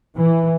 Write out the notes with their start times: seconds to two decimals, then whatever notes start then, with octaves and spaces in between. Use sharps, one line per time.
0.18 E3